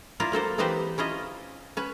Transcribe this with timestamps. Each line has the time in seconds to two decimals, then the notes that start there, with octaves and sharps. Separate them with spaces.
0.20 E4 F4 A#4 D5
0.32 F#3 A#3 A4 C5
0.58 E3 C4 D#4 G4 B4 C5
0.98 C#4 E4 F4 D#5
1.77 C#4 B4